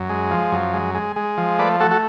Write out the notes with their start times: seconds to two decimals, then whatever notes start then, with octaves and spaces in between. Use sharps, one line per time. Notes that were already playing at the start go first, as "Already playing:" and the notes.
Already playing: F#2
0.09 G#3
0.31 F3
0.52 F#2
0.74 G#3
0.95 G#3
1.16 G#3
1.38 F3
1.59 A3 B4 D5
1.80 A3 F#4 A4
1.91 F#4 A4